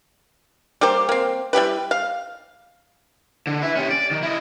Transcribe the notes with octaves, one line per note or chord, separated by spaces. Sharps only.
G3 A#3 G4 C5
A#3 C4
G3 E4 G4 B4
F5
D3
B4 E5
C#4 G4
D5
D#3
E4 D#5